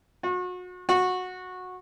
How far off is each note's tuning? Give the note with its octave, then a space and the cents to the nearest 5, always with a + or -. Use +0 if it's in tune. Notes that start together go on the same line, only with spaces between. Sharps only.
F#4 -35
F#4 -15